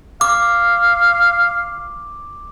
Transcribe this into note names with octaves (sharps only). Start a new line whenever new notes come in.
F5 D6